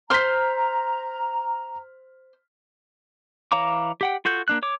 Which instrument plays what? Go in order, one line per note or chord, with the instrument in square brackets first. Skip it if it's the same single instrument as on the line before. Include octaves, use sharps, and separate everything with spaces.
[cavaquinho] C5 C6 [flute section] A#5 [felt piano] F6 B6
[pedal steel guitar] E3 C#5 F5 A#5 D6
G4 F#5 G5
F4 F#4 A4 G6
A#3 D4 F#6
C#5 D6